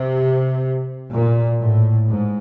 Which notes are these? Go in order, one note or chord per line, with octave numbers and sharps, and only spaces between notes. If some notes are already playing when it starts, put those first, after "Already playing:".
Already playing: C3
A#2
A2
G#2